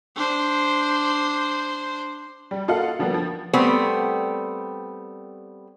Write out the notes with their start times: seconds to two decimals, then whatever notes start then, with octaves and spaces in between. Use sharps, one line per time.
0.16 D4 C5
2.51 G3
2.68 A#3 F4 A4 D#5 F5 F#5
2.99 D3 F3 G3 A#3 B3
3.14 F3
3.53 G3 A3 B3 C4